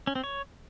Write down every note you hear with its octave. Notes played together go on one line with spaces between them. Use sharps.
C#4
C4
C#5